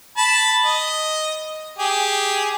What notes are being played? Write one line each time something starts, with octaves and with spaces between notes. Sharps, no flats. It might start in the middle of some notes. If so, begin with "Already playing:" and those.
A5 B5
D#5
G4 G#4